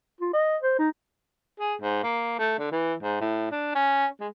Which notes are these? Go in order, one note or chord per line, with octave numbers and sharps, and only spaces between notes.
F4
D#5
C5
D#4
G#4
G#2
A#3
A3
D3
E3
G#2
A2
D4
C#4
G#3